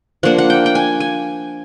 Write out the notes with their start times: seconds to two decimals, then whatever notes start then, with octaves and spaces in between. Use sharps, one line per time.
0.23 F3 A#3 D4 F#5
0.38 F#5
0.50 G5
0.66 G5
0.75 G#5
1.00 G#5